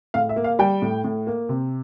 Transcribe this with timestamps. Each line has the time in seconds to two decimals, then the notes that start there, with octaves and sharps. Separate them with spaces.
0.14 A2 F5
0.29 E5
0.36 A#3
0.44 F5
0.59 G3 G5
0.82 A2
1.04 A2
1.27 A#3
1.49 C3